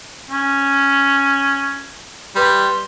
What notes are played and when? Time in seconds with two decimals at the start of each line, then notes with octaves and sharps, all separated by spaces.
0.31 C#4
2.36 G3 B4 C6